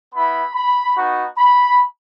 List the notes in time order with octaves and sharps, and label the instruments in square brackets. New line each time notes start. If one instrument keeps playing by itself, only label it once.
[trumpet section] B3 E4 B5
B5
B3 D#4 F#4
B5